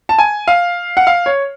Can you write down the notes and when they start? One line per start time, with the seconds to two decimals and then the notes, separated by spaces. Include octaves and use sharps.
0.09 A5
0.18 G#5
0.48 F5
0.97 F#5
1.07 F5
1.26 C#5